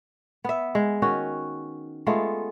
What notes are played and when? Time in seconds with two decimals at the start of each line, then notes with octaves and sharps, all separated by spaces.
0.44 B3 E5
0.75 G#3
1.02 D#3 C#4 F#4
2.07 G#3 A3 B3 F4